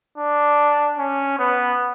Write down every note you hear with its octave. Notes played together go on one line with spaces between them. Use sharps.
D4
C#4
B3